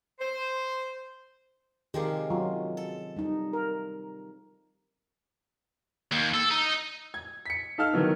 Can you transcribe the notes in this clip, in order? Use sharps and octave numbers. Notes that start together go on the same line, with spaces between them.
C5
C3 D#3 F3 G#3 G4 A#4
F#3 F4
A4
G3 D#4
A#4
D#2
A4
D#4
G#6
B6 C#7
D#4 A4 F5 E6 F6
D#3 E3 F#3 B3